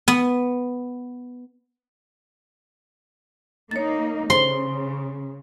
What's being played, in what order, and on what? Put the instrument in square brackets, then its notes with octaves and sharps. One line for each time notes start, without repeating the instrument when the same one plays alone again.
[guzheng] B3
[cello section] A#3 D#4 [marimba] C#5 A6
[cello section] C#3 [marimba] C5 [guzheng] C6